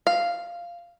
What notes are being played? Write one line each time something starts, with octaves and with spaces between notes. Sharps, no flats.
F5